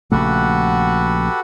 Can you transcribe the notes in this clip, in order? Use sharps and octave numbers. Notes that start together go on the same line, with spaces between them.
A#1 C#3 A3 F#4 G4 A4 B4 F#5